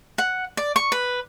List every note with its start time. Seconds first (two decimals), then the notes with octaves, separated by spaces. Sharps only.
0.18 F#5
0.57 D5
0.76 C#6
0.92 B4